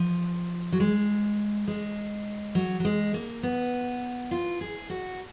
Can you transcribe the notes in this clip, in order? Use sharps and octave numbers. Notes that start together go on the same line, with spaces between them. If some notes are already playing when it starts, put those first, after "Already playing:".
Already playing: F3
F#3
G#3
G#3
F#3
F#3
G#3
A#3
B3
F4
G#4
F#4